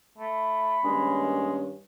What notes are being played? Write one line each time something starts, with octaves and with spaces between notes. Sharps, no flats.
A3 B5
G2 D#3 G#3 A#3 C#4